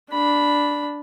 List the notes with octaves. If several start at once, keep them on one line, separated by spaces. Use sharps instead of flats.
D4 B5